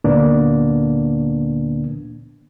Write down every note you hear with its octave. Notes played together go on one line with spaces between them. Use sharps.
D2 A#2 D3 A#3 B3 D4